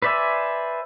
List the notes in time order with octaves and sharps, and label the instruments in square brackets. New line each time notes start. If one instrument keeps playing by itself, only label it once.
[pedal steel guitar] B4 C5 D5 E5 G#5